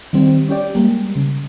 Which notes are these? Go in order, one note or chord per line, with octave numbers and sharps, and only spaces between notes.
D#3 G3 C4
C#4 G4 D5
G3 G#3 A#3
C#3